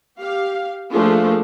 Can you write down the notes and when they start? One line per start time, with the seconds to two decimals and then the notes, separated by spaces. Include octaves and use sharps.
0.21 G4 F5
0.91 F3 A3 A#3 D4 F4 G#4